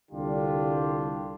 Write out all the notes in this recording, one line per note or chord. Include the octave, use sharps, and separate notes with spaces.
C2 D3 G3 D4 F4 G4